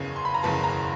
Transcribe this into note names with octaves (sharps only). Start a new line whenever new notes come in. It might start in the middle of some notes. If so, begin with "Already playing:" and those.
Already playing: F#1 E2 C#3 G#5
C6
B5
A#5
F#1 E2 C#3 A5
A#5